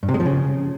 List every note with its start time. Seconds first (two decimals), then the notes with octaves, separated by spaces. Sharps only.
0.03 G2
0.08 C3
0.14 G#3
0.20 F3
0.25 C#3